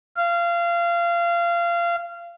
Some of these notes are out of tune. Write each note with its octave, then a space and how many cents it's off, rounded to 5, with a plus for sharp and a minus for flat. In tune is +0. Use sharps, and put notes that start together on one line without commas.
F5 -25